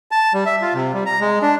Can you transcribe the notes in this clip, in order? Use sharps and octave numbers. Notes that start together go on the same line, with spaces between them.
A5
G3
E5
F4
C3
G3
A#5
G#3
D4